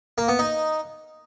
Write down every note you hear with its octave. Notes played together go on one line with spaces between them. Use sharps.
A#3
B3
D#4